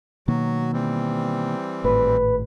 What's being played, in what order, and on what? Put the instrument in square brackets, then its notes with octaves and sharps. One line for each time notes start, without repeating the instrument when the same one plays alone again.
[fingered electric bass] B2 D#3 A#3 [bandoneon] F#3 F#4
[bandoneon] E3 G3 C4
[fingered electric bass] G#1 A2 [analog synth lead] B4